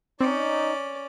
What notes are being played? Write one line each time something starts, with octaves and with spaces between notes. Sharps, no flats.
C4 C#4 D#4 D5